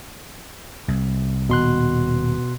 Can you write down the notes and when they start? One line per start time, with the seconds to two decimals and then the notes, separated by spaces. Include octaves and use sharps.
0.88 C2
1.49 D#1 B2 C6 F#6